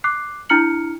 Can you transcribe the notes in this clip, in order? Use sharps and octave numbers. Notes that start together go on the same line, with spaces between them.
D6 F#6 C7
D4 E4 A#5 F6 C#7 F#7